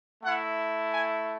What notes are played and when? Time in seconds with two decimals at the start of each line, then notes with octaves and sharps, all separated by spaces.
0.23 A3 E4 F#5
0.92 G#5